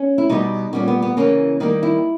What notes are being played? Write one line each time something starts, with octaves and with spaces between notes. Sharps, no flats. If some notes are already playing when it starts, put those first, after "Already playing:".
Already playing: C#4
E4
B2 G3 B3 D#4
A#2 G3 B3 C#4
B3
B3
C#3 E3 A#3 C#4
D#3 G3 A#3 D#4
E4